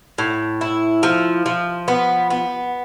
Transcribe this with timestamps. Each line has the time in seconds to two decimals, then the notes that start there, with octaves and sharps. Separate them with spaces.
0.18 A2
0.61 E4
1.03 F3
1.46 F3
1.88 B3
2.30 B3